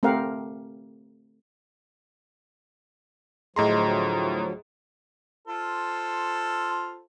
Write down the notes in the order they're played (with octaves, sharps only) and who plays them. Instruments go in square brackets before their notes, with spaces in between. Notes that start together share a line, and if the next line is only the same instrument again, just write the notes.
[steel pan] A3 C4 G4 A#4 F5 F#5
[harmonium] D2 F3 F#3 [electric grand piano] A2 A#5 C6 [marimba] G#4 D#5
[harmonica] F4 A4 C5